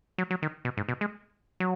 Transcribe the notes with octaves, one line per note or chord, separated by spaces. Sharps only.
F#3
F#3
D#3
B2
G#2
B2
G#3
F#3